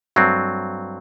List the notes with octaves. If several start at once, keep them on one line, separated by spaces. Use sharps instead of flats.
G2 F#3 A3 C4